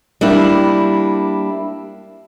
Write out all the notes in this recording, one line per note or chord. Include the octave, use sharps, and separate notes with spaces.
G3 A#3 D4 E4